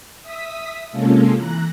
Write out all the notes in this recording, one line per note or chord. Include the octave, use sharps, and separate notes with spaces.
E5 D#6 B6
C3 G#3 A#3 C#4 F4 A4
E3 A#5 F#6